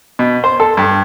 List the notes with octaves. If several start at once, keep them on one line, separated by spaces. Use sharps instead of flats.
B2
C5
A4
G2